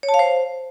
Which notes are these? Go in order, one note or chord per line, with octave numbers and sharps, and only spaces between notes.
C#5
A5
F5
C5